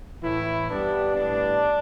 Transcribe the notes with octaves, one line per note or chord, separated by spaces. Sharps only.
A2 E3 A3 E4
G2 G3 B3 D4
A2 G3 B3 D4